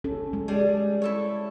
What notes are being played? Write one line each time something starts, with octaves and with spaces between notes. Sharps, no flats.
C#4 A4
G#3
G3 G#4
E4 A4 C#5